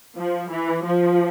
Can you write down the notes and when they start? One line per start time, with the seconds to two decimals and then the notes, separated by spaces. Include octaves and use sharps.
0.18 F3
0.51 E3
0.85 F3